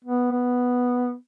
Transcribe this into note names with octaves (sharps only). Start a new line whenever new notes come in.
B3
B3